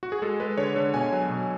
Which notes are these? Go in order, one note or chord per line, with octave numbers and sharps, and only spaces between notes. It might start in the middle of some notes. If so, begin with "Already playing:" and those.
F#4
G#4
G#3 A4
G#3 B4
D3 C#5
D3
B2 G#5
F#3
B2